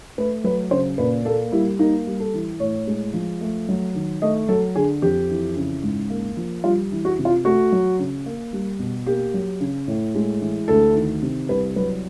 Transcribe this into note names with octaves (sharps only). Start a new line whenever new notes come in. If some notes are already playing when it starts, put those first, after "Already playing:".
A3 B4
F#3 B4
C#3 C5
A#2 B4
A#3 A4
G3 E4
A#3 D#4
G3
A4
E3
A2 C#5
G#3
F3
A3
F#3
D#3
A3 D#5
F#3 A4
D3 G#4
F2 G4
E3
C#3
G#2
A#3
F3
G3 F4
E3
F#4
C3
F4
A3 F#4
F#3
C#3
A#3
G3
B2
A#3 G4
F#3
C#3
A2
G#3
E3
D2 A4
D#3
C3
C2 B4
F#3 B4